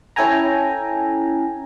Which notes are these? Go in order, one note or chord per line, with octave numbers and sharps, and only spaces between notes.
C#4 E4 A4 G5 G#5 A#5